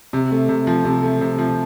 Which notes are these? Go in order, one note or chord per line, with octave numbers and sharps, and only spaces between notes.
C3
A3
C3
F3
C3
A3
C3
F3